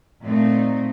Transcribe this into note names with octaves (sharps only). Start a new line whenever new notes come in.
A#2 A3 C4 D#4